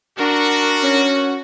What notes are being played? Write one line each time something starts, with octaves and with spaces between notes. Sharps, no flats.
D4 F#4 A#4
C#4